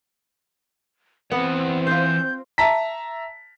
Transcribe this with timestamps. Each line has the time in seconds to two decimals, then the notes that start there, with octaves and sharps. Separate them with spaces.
1.32 E3 B3 C4 F#5
1.87 F4 C5 G6
2.58 E5 A5 A#5 B6